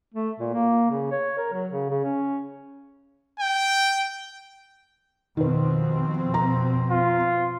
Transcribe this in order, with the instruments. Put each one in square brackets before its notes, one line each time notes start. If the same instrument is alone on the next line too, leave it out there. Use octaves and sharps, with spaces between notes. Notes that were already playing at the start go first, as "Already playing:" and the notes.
[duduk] A3
A#2
A#3
C#3
C#5
A#4
F#3
C#3
C#3
C#4
[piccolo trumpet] G5
[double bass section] F2 B2 C4 [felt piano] D#3 B4
[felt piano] A#5
[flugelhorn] F4